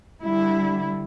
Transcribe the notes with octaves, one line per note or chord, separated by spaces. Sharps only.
D3 G3 E4